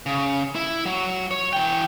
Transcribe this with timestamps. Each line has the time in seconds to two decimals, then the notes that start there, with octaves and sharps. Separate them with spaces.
0.06 C#3
0.55 E4
0.85 F#3
1.31 C#5
1.53 E3 G5